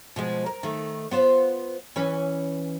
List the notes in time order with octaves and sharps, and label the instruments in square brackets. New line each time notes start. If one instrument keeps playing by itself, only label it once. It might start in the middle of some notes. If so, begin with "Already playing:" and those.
[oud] B2 F3 G#3
A#4
D#3 A3
B3 F4 C5
E3 C#4 B4